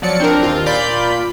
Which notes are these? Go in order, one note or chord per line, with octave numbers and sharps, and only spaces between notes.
F3 F#3 D5 C#7
C4 D4 A#4
D#2 F4
A#2 F4 D5 B5 G6